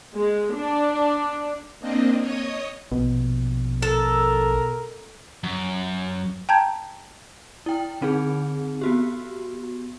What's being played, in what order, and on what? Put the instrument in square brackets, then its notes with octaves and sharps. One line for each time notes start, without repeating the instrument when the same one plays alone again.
[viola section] G#3
D4
[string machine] A#3 C4 D4 D#5
C#5 D#5 D#6
[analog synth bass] A#1 [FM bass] B2
[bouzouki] A4 [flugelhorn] A#4
[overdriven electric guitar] F#2
[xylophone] G5 A5 A#5 G6 G#6
[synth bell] E4 G5
D3 C4 D#4 G#4
B3 F#4 G4